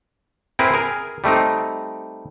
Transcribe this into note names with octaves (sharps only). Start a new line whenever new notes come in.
C4 E4 G#4 A#4 B4
G#4 A#4
G3 A3 C4 D#4